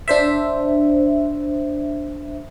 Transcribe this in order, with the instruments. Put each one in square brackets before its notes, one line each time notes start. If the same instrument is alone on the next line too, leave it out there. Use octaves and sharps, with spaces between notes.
[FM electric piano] D4 C5 E5